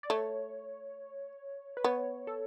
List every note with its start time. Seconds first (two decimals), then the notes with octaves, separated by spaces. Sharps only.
0.03 D5
0.10 A3 C#5
1.77 B4
1.84 B3 C#5
2.27 A4